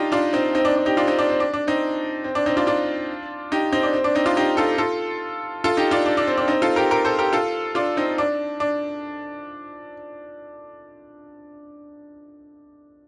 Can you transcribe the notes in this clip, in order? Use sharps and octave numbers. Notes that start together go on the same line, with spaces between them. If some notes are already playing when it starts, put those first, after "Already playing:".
Already playing: D4 D#4 F4 G4
D4 F4
C4 D#4
C4 D#4
D4
D4
D#4 G4
D4 F4
C4 D#4
D4
C4
D4
D4
C4 D#4
C4
D4
C4 D#4
D4 F4
D4 F4
D#4 G4
C4 D#4
D4
C4
D4
C4 D#4
D4 F4
D#4 G4
F4 A4
F4 A4
F4 A4
D#4 G4
D4 F4
D4
D4
C4
D4
C4 D#4
F4 A4
G4 A#4
G4 A#4
A4 C5
G4 A#4
F4 A4
D4 F4
C4 D#4
D4
D4